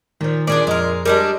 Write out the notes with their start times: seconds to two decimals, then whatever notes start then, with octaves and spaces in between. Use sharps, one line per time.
0.21 A#2 D#3 F3
0.47 A#2 D4 G#4 D5
0.67 F2 G#3 A#4
1.05 G3 G#3 D4 A#4